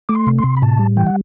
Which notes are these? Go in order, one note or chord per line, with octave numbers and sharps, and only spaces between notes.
A3 D6
C6
C3
C6
C3
B5
A2 A5
G3
E3 G5
F#5